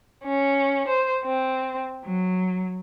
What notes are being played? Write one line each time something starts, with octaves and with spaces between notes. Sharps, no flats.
C#4
C5
C4
F#3